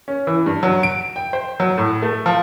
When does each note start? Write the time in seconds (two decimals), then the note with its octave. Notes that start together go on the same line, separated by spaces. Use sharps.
0.08 C#4
0.27 E3
0.46 G2
0.63 F#3
0.83 D7
1.16 G5
1.33 C5
1.60 F#3
1.78 A2
2.02 A3
2.26 F3